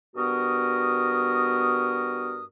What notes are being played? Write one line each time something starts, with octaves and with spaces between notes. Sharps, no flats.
G2 B3 F#4 A#4 D#6